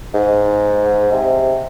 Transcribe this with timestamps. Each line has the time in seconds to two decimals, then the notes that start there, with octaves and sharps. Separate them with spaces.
0.14 G#2
1.12 C3